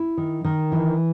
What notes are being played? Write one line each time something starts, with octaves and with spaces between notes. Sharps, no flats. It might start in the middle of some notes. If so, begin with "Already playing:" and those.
Already playing: E4
D#3
D#3
E3